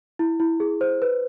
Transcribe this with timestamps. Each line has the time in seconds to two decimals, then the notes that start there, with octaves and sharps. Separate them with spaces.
0.19 E4
0.40 E4
0.60 G#4
0.81 C5
1.02 B4